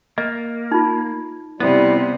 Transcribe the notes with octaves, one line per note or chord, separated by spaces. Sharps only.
A#3 D#5
D#4 F4
C3 G3 B3 E4